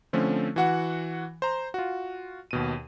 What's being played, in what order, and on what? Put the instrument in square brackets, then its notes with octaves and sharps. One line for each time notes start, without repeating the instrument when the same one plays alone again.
[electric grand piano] D3 F3 A3 C4 C#4
E3 F#4 F#5
C5 A#5
F4 F#4
D#2 B2 D#7